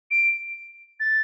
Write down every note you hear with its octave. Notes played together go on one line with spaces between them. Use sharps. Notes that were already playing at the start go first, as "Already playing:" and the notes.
D7
A6